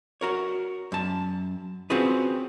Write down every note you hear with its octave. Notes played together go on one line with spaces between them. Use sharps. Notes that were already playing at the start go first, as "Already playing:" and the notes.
F#4 A#4 C#5
F#2 A5
C4 C#4 F4 F#4 G#4 B4